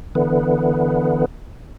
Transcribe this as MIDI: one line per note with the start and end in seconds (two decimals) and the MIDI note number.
0.15 1.25 50
0.15 1.25 52
0.15 1.25 59